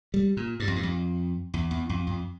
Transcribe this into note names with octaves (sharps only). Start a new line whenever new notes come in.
G3
A#2
G2
F2
G2
F2
E2
E2
F2
F2